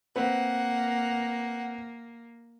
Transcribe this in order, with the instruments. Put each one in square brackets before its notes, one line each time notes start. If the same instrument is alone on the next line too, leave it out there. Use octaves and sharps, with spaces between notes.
[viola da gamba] A#3 [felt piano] C4 B4 [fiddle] F#5